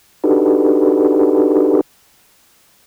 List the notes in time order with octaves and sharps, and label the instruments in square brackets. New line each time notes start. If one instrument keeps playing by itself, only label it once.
[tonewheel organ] D4 D#4 F#4 G4 A4 B4